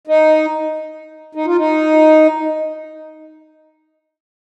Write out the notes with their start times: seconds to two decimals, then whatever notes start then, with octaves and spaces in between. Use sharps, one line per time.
0.07 D#4
1.35 D#4
1.46 F4
1.57 D#4